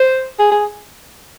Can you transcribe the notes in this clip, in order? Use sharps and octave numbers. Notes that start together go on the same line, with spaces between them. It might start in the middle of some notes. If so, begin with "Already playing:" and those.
Already playing: C5
G#4
G#4